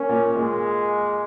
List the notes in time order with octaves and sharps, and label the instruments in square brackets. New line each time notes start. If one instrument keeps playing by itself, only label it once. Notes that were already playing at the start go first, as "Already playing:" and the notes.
Already playing: [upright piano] A#3 [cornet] C#4
[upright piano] A#2
[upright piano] A#2 [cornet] G#3